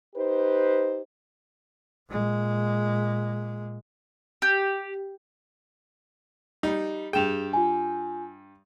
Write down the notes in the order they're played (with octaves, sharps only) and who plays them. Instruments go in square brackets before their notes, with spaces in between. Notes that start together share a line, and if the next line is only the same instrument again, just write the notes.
[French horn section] D#4 G4 B4 C5
[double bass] A#2 G#3
[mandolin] G4
[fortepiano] G3 D#4
[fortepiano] G2 G5 [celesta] G#4 E7 F7
[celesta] F4 G#5